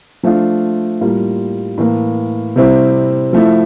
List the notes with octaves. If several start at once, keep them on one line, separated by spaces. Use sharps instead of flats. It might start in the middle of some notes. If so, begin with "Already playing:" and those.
F3 A3 D4 F4
A2 G3 A#3 F4
A2 E3 A#3
C3 G3 C4 E4
F3 A3 E4